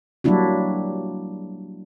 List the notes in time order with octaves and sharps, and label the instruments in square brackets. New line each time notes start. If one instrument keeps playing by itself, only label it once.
[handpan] F#3 G3 A#3 D4 E4 F#4